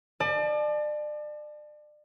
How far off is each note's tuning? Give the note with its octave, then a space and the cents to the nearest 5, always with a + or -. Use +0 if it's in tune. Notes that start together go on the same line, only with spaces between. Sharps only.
D5 +35 A5 -30